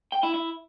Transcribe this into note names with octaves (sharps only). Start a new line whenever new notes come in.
G5
E4
E4